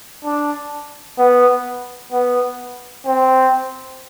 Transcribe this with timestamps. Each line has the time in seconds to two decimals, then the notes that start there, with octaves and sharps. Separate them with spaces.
0.24 D4
1.19 B3
2.12 B3
3.06 C4